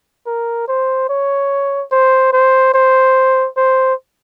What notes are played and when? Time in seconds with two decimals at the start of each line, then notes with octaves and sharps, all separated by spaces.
0.27 A#4
0.68 C5
1.09 C#5
1.92 C5
2.33 C5
2.74 C5
3.57 C5